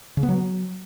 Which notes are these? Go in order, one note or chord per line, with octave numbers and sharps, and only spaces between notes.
C#3
B3
F#3